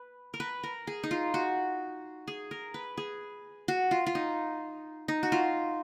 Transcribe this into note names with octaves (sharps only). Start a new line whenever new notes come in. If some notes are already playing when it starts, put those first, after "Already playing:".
Already playing: B4
A#4
B4
A#4
G#4
D#4
F4
F#4
G#4
A#4
B4
G#4
F#4
F4
F4
D#4
D#4
F#4
F4